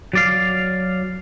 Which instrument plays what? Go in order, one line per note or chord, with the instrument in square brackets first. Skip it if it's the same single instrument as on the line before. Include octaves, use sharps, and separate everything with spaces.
[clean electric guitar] F#3 D5 F5